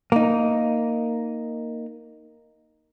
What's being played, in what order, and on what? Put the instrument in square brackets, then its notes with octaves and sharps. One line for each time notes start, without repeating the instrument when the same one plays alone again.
[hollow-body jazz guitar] A#3 D#4